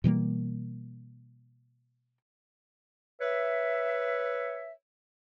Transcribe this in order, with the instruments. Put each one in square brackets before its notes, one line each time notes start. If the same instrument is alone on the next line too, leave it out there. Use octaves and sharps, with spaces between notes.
[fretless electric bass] B2 E3 G3 A#3
[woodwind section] B4 C#5 E5